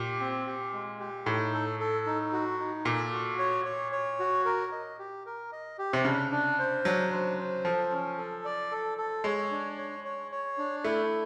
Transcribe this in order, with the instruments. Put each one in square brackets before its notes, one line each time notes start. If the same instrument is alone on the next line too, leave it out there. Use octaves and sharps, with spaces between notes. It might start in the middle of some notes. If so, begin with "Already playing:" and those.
Already playing: [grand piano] A#2 [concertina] G4
[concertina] C4
G4
G#3
G4
[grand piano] A2 [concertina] D#4
[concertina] A4
A4
D#4
F#4
D#4
[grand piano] A#2 [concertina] A4
[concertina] F#4
C#5
C#5
C#5
F#4
A#4
D#5
G4
A#4
D#5
G4
[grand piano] C3
[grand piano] C#3 [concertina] D4
[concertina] D4
C5
[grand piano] F#3 [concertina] D4
[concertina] C5
C5
[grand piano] F3 [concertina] A4
[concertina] C#4
A4
D5
A4
A4
[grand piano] G#3 [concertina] C#5
[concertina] D4
C#5
C#5
C#5
D4
[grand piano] A3 [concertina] E4